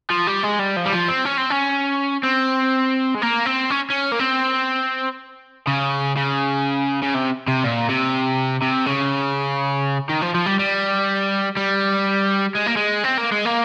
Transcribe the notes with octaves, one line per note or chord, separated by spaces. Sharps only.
F3
G3
G#3
G3
F3
G3
F3
C4
C#4
C4
C#4
C4
G#3
A#3
C4
C#4
C#4
A#3
C4
C#3
C#3
C#3
C3
C3
A#2
C3
C3
C#3
D#3
F3
F3
G3
G3
G3
G#3
A#3
G#3
C4
A#3
G#3
A#3